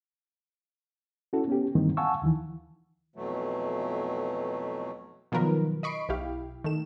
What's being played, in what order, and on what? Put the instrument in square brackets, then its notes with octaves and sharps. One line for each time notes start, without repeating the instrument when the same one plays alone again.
[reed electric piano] C#4 E4 F#4 A4
B3 C#4 G4
G2 D#3 E3 G3 A#3 C4
F5 F#5 G#5 A5 C#6 E6
D#2 D#3 E3
[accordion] F2 B2 E3 F#3 A3
[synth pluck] B2 D#3 F3 F#3 A#4 B4
D#5 B5 C#6 C7 D7
B1 E4 G4 F5
D#3 A3 E7